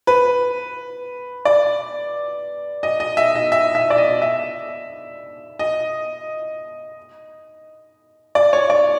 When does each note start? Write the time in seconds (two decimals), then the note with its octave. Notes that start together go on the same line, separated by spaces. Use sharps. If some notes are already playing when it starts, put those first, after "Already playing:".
0.07 B4
1.45 D5
2.83 D#5
3.00 D#5
3.17 E5
3.35 D#5
3.52 E5
3.75 E5
3.90 D5
3.98 D#5
4.22 E5
5.59 D#5
8.35 D5
8.53 C#5
8.70 D5